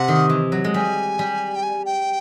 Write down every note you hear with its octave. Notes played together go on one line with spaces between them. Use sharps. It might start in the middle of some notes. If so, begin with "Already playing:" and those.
Already playing: C3 F#5
D#3
E3
F#3
G#3
G3 G#5
G3
G5
G#5
G5